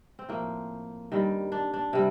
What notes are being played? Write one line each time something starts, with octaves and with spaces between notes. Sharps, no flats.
C4
A2 F3 A#3
G2 D#3 G3
D4
D4
C3 G3